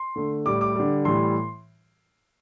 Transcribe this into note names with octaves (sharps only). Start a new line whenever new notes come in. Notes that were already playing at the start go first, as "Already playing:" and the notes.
Already playing: C6
D3 A3
A2 G3 D6
D6
D3 G3
A2 E3 G3 C6